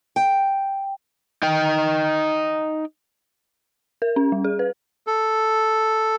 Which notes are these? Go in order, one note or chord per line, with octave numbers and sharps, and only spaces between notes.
G5
D#4 G5
A#4
C#4
G3
G#4
B4
A4